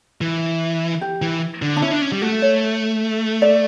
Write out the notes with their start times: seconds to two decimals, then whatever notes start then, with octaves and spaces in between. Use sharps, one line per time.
0.21 E3
1.01 G4
1.22 E3
1.62 D3
1.76 D4
1.82 C#4 E4
1.91 D4
2.02 C#4
2.12 G3
2.22 A3 F#4
2.42 C#5
3.42 D5